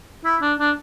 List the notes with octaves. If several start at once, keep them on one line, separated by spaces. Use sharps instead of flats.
E4
D4
D4